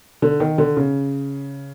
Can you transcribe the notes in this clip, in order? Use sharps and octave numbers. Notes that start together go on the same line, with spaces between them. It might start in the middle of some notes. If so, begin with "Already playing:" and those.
D3
D#3
D3
C#3